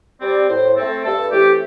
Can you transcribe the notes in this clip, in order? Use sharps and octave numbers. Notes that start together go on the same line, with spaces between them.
G3 C4 D5
A2 C5
A3 C4 A4
G2 A4
E3 A3 C4 G4